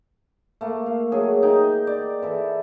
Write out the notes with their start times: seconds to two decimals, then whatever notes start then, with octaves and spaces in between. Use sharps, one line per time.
0.61 A3 A#3
0.86 F5
1.12 F#3 G#4
1.43 D#4 G5
1.87 D5
2.22 E3 A4